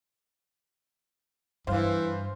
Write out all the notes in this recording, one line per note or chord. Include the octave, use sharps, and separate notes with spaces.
G2 E3 C5 F5